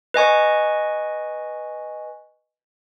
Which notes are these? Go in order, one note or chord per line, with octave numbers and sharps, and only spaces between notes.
B4 D#5 G#5 C#6